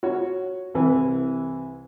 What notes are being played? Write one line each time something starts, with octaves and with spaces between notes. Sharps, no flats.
F#4 C#5
C2 E3